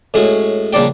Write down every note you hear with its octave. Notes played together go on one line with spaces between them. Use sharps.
A2 G#3 C#4 F#4
A#1 C#3 G3 D4 D5 G5